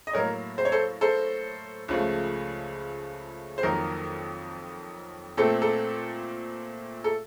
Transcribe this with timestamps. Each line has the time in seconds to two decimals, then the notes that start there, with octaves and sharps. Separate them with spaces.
0.07 D#5
0.13 A2 F#3 A#3 A#4 C#5
0.58 C5
0.65 C#5
0.72 A4 C5
1.01 A4 C5
1.88 C#2 C#3 F3 A3
3.58 C5
3.63 F2 D#3 F#3 A#3 A#4
5.37 A#2 A3 C4 A4
5.62 A4
7.04 A4